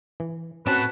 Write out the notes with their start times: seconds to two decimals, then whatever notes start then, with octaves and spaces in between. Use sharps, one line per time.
0.20 E3
0.67 A2 C4 C#4 F#4 B4 A5